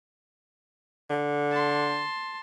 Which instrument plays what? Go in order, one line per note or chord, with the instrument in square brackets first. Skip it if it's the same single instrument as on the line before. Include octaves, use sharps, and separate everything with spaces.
[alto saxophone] D3
[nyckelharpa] A5 C6